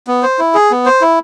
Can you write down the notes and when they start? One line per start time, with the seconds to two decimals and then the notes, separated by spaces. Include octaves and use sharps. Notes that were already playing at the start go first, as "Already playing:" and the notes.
0.07 B3
0.23 C5
0.39 E4
0.54 G#4
0.71 B3
0.86 C5
1.01 E4